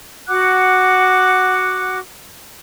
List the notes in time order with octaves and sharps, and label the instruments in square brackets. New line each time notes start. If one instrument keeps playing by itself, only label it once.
[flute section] F#4 F#5 D6 F#6